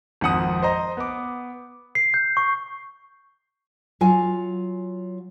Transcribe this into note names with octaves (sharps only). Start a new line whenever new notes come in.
G#1 F2 F#5 D#6
C5 D#5 A#5
B3 D6
C7
G6
C#6
F#3 F4 G#5